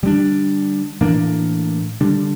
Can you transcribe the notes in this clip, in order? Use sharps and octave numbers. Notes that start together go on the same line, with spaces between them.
D3 G3 A#3 D4
A2 E3 A#3 D4
D3 G3 D4